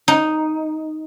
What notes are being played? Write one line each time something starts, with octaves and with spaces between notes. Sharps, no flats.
D#4